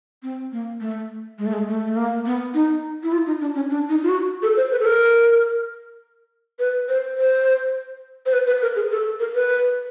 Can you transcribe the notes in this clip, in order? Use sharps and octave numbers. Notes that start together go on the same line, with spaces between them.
C4
A#3
A3
G#3
A3
G#3
A3
A3
A#3
B3
D#4
E4
F4
D#4
D4
C#4
D4
D#4
F4
F#4
A4
C5
B4
A4
A#4
B4
C5
C5
C5
B4
B4
A#4
G#4
A4
A#4
B4